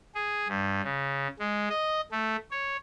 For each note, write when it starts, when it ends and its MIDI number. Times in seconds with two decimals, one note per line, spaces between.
0.15 0.48 68
0.49 0.81 43
0.84 1.28 49
1.39 1.69 56
1.70 2.01 75
2.12 2.37 57
2.51 2.77 73